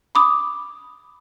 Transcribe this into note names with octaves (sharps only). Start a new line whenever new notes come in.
B5 D6 D#6